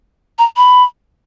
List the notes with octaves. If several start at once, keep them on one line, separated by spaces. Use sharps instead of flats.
A#5
B5